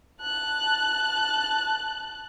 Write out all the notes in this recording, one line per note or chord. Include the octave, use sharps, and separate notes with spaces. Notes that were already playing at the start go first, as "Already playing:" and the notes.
A5 F#6